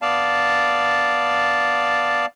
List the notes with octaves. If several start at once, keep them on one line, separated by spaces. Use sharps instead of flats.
B3 D5 F5 A5